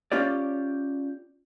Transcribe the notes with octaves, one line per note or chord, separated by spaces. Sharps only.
C#4 F4 G4 D5